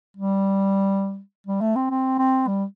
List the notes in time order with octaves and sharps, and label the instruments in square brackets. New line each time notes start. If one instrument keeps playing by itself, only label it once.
[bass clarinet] G3
G3
A3
C4
C4
C4
G3